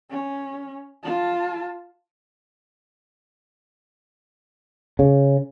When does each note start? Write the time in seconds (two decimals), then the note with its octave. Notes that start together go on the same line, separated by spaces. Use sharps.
0.11 C#4
1.04 F4 A5
4.99 C#3